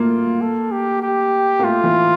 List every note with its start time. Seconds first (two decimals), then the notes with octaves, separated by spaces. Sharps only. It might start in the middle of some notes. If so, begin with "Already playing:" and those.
Already playing: A3 A#3 F4
0.41 A4
0.72 G4
1.02 G4
1.59 A#3
1.64 A3 F4
1.84 E3